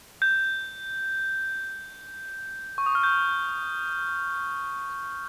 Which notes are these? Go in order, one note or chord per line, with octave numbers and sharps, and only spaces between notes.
G6
C#6
D#6
F6
G6